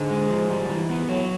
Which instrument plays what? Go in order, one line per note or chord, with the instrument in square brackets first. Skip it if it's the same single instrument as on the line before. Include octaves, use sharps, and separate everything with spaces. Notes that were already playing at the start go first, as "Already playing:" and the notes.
Already playing: [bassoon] G#2 [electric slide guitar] D3
[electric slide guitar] G#3
F3
G3
E3
B3
[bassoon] A2 [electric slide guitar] F#3